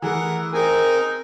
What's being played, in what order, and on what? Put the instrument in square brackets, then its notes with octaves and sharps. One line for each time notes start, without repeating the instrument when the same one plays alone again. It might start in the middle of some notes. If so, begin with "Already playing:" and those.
[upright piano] E3 A3 G#4 [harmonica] A#4 F#5
[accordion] C4 A#4 [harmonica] D#4 G#5 [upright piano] G#4